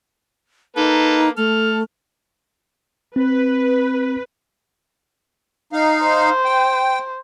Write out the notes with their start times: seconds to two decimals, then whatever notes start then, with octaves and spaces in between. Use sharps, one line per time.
0.77 A#3 D#4 A4 B4
1.37 A3 A4 F6
3.16 C4 B4
5.73 D#4 F5
6.03 C5
6.45 G5